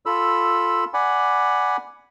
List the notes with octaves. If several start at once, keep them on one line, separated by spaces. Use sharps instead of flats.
F4 A4 B5 E6
D5 F#5 G#5 B5